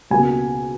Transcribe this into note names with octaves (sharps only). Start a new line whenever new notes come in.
C#2 B2 A#3 G#5